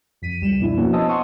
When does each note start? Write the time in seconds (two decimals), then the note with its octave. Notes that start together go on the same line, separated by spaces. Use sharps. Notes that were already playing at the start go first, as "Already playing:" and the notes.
0.22 F2 B6 D#7
0.41 C#2 G3 E7
0.59 F2 B2 B3 D4 E4
0.76 F3 A#3 B3 C#4 E4 F#4
0.93 C5 D#5 G#5 A5 D#6 E6
1.09 D#5 F#5 A5 C6 C#6 D#6